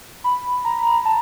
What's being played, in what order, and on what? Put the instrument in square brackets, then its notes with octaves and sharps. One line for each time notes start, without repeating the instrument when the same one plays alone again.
[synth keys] B5
A#5
B5
A#5
A5